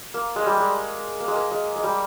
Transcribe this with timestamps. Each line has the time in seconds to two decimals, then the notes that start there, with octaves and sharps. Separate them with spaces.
0.14 A#3
0.36 G#3
0.46 G3
0.57 G#3
1.20 A#3
1.28 G#3
1.35 A#3
1.51 G#3
1.76 G#3
1.83 G3